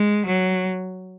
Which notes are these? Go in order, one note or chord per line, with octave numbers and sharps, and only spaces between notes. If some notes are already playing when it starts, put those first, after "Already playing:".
Already playing: G#3
F#3